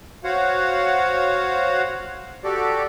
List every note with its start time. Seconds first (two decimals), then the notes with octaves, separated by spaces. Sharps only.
0.24 F#4 C5 C#5 F5 F#5
2.44 F#4 G4 A4 D5